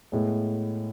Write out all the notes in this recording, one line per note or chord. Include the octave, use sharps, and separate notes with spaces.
A2 G#3 B3